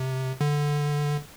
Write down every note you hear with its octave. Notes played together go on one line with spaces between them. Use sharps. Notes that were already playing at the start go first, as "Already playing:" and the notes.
Already playing: C3
D3